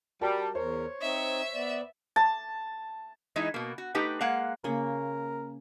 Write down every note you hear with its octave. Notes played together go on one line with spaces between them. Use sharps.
G3 F#4 A#4 A5
E2 A#4 C5 C#5
C4 D#4 D#5 E5
B3 D5
A5
E3 G#3 D#4 E4
B2 A#3
F#4
A3 D#4 G4 B4 G5
G#3 A#3 F5 F#5
C#3 A#3 A#4